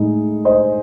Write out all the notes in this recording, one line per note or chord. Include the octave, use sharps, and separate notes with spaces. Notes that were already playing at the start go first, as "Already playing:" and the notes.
Already playing: A2 G#3 D#4
C5 D#5